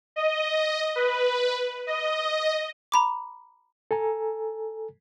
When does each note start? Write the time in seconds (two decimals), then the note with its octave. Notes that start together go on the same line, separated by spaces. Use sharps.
0.16 D#5
0.96 B4
1.87 D#5
2.92 A#5 B5 D6
3.91 A4 G#5 A#5